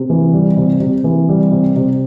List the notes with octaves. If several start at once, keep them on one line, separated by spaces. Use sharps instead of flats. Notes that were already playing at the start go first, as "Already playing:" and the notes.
Already playing: C3
E3
G3
C3
C3
E3
G3
C3
C3